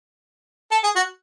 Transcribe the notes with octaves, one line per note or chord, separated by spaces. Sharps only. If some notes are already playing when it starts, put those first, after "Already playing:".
A4
G#4
F#4